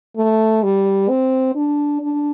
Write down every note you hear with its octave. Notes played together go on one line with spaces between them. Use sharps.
A3
G3
C4
D4
D4